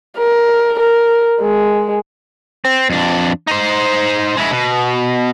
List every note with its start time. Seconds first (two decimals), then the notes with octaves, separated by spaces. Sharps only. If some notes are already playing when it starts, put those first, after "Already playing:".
0.18 A#4
0.79 A#4
1.42 G#3
2.65 C4
2.90 F2 D4
3.47 D#4 C5
4.37 G#3 E4
4.51 B2